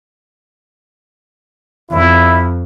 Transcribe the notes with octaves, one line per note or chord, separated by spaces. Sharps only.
F2 E4